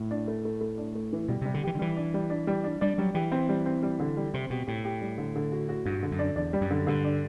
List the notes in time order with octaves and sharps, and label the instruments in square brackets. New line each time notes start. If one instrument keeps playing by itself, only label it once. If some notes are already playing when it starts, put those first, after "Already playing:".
Already playing: [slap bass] A2
[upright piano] D4
A3
A3
A3
D4
A3
E3
[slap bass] B2 [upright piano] G3
[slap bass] C3 [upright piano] G3
[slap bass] D3
[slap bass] E3 [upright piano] G4
[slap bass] D3
[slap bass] E3 [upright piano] G3
[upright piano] D4
G3
D4
G3
D4
[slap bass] G3 [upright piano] D4
[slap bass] F#3 [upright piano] G3
[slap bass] E3 [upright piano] G4
[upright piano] C4
G3
C4
G3
D3
G3
[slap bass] C3 [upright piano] C4
[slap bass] B2 [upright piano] G4
[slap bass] A2 [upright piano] G4
[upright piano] G4
G3
D3
D3
F#4
F#4
[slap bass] G2 [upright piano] F#4
[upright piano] D3
[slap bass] F#2
[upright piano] D4
[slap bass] E2 [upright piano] D4
[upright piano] G3
[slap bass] F#2
[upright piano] D3
[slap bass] G2 [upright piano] D3
[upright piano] D4